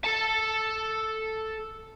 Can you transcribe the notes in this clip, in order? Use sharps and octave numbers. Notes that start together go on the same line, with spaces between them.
A4 A5